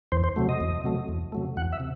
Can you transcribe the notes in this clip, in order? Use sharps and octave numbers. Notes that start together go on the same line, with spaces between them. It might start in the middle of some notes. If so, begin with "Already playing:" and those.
E2 C5
C5
C3 F#3 A3
D#5
E2
C3 F#3 A3
E2
C3 F#3 A3
E2 F#5
E5
C3